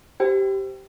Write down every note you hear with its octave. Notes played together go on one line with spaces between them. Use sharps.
G4 C5 G5